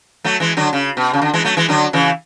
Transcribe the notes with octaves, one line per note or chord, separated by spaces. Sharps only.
F#3 A3
E3 G#3
D3 F#3
C#3
B2
C#3
D3
E3 G#3
F#3 A3
E3 G#3
D3 F#3
C#3 E3